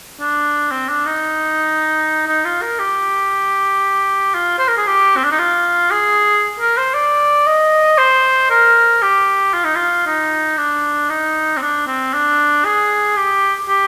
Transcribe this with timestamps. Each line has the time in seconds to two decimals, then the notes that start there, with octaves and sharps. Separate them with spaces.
0.20 D4
0.71 C4
0.89 D4
1.06 D#4
2.27 D#4
2.45 F4
2.62 A#4
2.79 G4
4.35 F4
4.59 C5
4.68 A#4
4.77 G#4
4.87 G4
5.17 C4
5.24 D4
5.32 D#4
5.39 F4
5.91 G#4
6.60 A#4
6.77 C5
6.94 D5
7.47 D#5
7.98 C5
8.50 A#4
9.02 G4
9.54 F4
9.64 D#4
9.75 F4
10.06 D#4
10.57 D4
11.09 D#4
11.57 C4
11.62 D4
11.87 C4
12.13 D4
12.65 G#4
13.17 G4
13.69 G4